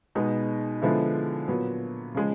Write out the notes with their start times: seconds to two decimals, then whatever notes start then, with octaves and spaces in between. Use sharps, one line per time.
0.15 B2 G#3 B3 D#4
0.82 D3 F3 G#3 B3 E4
1.48 A#2 F#3 B3
2.14 C#3 F3 G#3